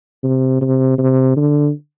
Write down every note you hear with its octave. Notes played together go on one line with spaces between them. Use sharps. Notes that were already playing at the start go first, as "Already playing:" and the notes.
C3
C3
C3
D3